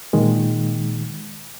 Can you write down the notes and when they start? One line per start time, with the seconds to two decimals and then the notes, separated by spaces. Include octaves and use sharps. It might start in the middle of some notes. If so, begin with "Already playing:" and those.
0.13 A#2 D#3 G#3